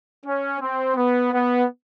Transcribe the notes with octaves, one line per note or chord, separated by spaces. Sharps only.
C#4
C4
B3
B3